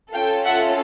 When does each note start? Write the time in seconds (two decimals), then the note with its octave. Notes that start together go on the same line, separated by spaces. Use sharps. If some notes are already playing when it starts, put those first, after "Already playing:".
0.13 C#4 F4 A4 F5 G5
0.45 E5 F#5